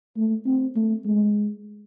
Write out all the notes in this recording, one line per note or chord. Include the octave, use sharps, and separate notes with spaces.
A3
C4
A3
G#3